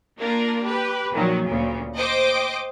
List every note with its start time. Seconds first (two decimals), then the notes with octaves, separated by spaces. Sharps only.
0.18 A#3 D4 F4 A#4
0.63 G4 B4
1.12 A#2 D#3 F3 F#3
1.46 D2 A#2 C#3
1.97 C5 D#5 G5 D6